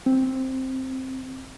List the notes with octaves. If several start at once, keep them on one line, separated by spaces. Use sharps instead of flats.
C4